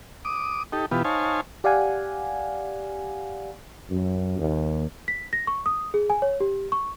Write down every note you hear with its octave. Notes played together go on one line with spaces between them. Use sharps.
D6 D#6
D#4 G4 A4
B2 E3 B3 F4 G4
D#4 C5 C#5 F5 G#5 A5
G4 D5 F5 F#5 G#5
F#2
D#2
B6
A#6
C#6
D#6
G#4
G#5
C#5
G4
C#6